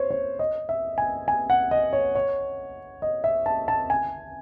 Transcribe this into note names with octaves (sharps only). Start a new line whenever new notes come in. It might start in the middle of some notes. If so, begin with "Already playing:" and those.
Already playing: C5 C#5
C#5
D#5
E5
G#5
G#5
F#5
D#5
C#5
C#5
D#5
E5
A5
A5
G#5